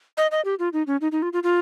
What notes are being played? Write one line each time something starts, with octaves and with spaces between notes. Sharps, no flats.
D#5
D#5
G4
F4
D#4
C#4
D#4
D#4
F4
F4
F4